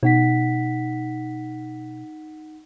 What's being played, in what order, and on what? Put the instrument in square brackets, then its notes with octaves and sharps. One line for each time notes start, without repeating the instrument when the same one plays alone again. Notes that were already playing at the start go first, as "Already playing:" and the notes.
[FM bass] B2 [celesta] D#4 F#5 B6